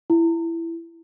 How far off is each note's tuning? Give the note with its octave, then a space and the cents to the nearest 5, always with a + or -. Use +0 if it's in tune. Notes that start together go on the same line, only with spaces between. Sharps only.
E4 +15